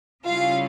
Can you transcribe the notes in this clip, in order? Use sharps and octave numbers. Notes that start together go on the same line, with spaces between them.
C#3 G3 C#4 E4 F4 F5